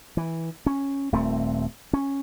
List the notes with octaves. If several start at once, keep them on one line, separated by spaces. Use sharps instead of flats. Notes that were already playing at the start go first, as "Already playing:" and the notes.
E3
C#4
D#1 A3 C4
C#4